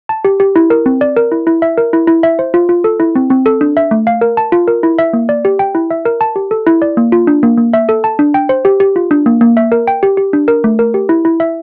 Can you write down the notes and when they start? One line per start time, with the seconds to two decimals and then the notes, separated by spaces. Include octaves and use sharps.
0.09 A5
0.25 G4
0.40 G4
0.56 E4
0.70 A#4
0.86 C4
1.01 D5
1.17 A#4
1.32 E4
1.47 E4
1.62 E5
1.78 A#4
1.93 E4
2.07 E4
2.23 E5
2.39 C5
2.54 F4
2.69 F4
2.84 A4
3.00 E4
3.15 C4
3.30 C4
3.46 A4
3.61 D4
3.77 E5
3.91 A3
4.07 F5
4.21 A#4
4.37 A5
4.52 F4
4.68 A#4
4.83 E4
4.99 E5
5.13 A#3
5.29 D5
5.45 G4
5.59 G5
5.75 E4
5.91 E5
6.05 A#4
6.21 A5
6.36 G4
6.51 A4
6.67 E4
6.82 D5
6.97 A#3
7.12 F4
7.27 D4
7.43 A#3
7.58 A#3
7.73 E5
7.89 A4
8.04 A5
8.19 D4
8.34 G5
8.49 C5
8.65 G4
8.80 G4
8.96 F4
9.11 D4
9.26 A#3
9.41 A#3
9.57 E5
9.72 A#4
9.88 G5
10.03 G4
10.17 G4
10.33 D4
10.48 A#4
10.64 A3
10.79 A#4
10.94 G4
11.09 E4
11.25 E4
11.40 E5